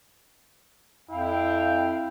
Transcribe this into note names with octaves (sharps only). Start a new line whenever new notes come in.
F2 E4 F5 G5